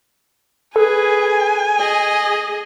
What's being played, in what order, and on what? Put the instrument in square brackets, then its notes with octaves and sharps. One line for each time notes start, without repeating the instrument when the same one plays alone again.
[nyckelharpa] G#4 B4 [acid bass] A4 [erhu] G#5
[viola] G#4 D#5 [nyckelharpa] D#6